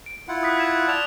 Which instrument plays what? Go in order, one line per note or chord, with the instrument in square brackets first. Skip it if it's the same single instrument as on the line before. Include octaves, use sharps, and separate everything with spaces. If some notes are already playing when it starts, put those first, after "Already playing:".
[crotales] D7
[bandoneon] E4 F4 F#5
[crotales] D#6 F#6 B6
G#6 E7
[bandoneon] D5 A5 [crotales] F6 G#6 F7